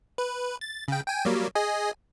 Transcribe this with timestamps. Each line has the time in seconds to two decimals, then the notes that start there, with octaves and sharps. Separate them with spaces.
0.18 B4
0.61 A6
0.88 C#3 G5
1.08 G5 G#5
1.25 F#3 G3 A#3
1.55 G#4 D#5 G#5